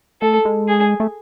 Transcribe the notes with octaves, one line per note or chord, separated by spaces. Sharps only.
A3 A4
G#3
G#4
A3